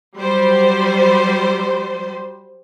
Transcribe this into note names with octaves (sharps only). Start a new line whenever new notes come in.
F#3 G3 C5